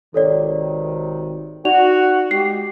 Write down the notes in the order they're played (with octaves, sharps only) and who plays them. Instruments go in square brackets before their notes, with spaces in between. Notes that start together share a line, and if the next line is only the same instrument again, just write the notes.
[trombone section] G#1 C3 D#3 [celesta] A4 C#5 D5
[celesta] D#4 D5 F7 [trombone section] F#4
[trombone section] G#3 G4 [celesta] C7